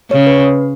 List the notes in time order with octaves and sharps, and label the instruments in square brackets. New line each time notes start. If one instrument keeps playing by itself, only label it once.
[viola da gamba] C#3 [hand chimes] C#5
[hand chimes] B4